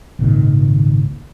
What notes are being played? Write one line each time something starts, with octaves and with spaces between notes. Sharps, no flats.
G#1 C#2 A#2 D#3